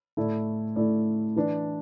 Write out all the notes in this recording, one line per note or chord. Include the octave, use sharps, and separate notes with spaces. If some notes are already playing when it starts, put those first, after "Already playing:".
A2 A3 E4 A4 D5
A2 A3 E4 A4 D5
E3 D4 B4 D5